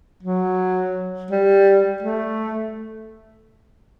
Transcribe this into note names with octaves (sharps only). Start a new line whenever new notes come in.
F#3
G3
A3